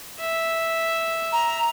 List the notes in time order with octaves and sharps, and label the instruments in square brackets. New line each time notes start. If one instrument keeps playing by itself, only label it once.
[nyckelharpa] E5
[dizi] A#5